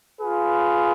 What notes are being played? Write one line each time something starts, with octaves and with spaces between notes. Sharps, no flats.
F4 G#4 B4